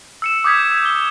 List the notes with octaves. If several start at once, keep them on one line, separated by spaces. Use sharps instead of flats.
E6 C#7 E7
D6 D#6 G6 G#6 B6
G#6
G7